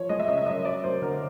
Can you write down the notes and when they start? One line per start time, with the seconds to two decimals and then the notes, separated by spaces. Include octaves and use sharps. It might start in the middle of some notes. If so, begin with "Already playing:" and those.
Already playing: F3 C#5
0.09 G#3 D#5
0.20 E5
0.28 C#3 D#5
0.38 E5
0.46 F#2 D#5
0.65 F#3 D5
0.84 F#2 C5
1.02 D3 A#4